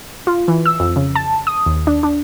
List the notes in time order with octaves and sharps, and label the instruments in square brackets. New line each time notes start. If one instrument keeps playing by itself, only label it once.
[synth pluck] F4
E3
E6
F2
C#3
A5
D#6
D#2
D4
D4